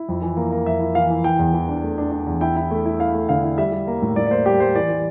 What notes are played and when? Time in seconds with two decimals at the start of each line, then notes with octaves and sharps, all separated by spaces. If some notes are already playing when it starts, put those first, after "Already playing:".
Already playing: E4
0.09 F2
0.22 E3
0.37 A#3
0.52 A#3
0.66 F2 E5
0.81 E4
0.95 E3 F5
1.10 E3
1.24 E3 G5
1.39 E2
1.54 E3
1.69 D4
1.83 A3
1.98 D4
2.12 D4
2.27 E2
2.41 E4 G5
2.56 E4
2.71 A3
2.86 E4
3.00 E4 F5
3.14 A3
3.29 D3 F5
3.44 E4
3.58 G3 E5
3.72 G3
3.87 A#3
4.02 A2
4.16 A2 D5
4.27 D5
4.31 A#3 C5
4.46 G3 G4
4.60 G3 C5
4.75 E3 D5
4.90 E3